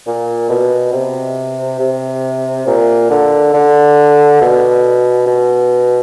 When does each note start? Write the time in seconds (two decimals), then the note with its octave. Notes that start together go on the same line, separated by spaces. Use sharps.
0.07 A#2
0.49 B2
0.93 C3
1.79 C3
2.67 A#2
3.10 D3
3.54 D3
4.41 B2
5.27 B2